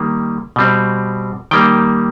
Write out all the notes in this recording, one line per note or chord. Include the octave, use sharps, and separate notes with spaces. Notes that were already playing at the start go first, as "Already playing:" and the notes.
Already playing: D#3 G3 A#3
B2 G3 C4
D#3 G3 A#3 G5